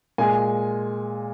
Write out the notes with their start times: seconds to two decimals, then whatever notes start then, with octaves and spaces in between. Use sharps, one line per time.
0.18 A#2 G#3 G#5